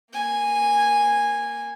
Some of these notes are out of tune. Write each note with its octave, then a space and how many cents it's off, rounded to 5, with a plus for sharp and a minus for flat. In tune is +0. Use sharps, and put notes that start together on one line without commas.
A#3 +0 G#5 -10